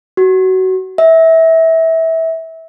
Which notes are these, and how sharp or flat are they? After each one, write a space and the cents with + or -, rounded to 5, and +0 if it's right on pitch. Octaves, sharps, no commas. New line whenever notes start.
F#4 +20
E5 -20